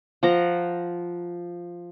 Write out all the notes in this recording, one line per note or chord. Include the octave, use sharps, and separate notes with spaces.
F3 F#5 A#5